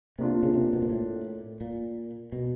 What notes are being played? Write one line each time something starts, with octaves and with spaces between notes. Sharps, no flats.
C3 A#3 D4 F4
C#3
C3
B2
A#2
A2
A#2
B2